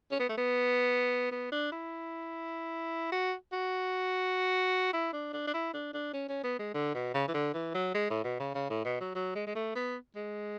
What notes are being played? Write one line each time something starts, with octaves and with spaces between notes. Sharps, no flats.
C#4
B3
A3
B3
B3
D4
E4
F#4
F#4
E4
D4
D4
D4
E4
D4
D4
C#4
C#4
B3
G#3
D3
B2
C#3
E3
D3
E3
F#3
G#3
A2
B2
C#3
C#3
A2
B2
F#3
F#3
G#3
G#3
A3
B3
G#3